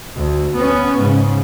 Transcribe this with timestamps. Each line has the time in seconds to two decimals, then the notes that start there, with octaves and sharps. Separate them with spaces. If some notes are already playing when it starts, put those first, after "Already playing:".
0.16 D2
0.56 B3 C#4
1.00 G#2 C#3